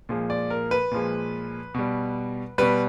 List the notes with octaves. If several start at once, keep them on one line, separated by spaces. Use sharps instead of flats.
A#2 F3 G#3
D5
A#4
B4
A#2 F3 G#3
B2 G3
B2 G3 B4